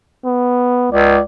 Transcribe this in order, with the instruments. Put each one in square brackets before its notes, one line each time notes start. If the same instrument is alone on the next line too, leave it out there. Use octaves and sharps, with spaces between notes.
[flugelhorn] B3
[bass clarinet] C#2 [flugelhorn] D5